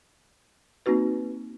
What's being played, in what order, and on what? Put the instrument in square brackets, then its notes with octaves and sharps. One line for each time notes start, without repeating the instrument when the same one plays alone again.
[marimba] A#3 C4 D#4 F#4 B4